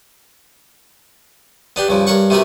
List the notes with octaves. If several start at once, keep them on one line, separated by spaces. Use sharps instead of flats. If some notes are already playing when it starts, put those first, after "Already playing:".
B3 D4 G4
G2 C#3 F3
G2 A#4 C#5 F#5 C#6
C3 A3 B3 F#4 A#4